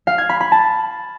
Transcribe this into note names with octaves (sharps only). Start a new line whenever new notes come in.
F5
G#6
B5
B5
A5